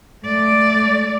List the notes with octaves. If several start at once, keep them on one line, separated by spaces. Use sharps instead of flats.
A3 D5